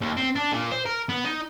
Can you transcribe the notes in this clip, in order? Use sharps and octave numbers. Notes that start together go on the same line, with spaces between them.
D#2
C4
D4
A#2
C5
A#4
B3
D#4